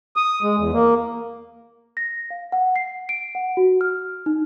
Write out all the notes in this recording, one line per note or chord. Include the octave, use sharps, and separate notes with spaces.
D#6
G#3
E2
A#3
A#6
F5
F#5
C7
D7
F#5
F#4
F6
D#4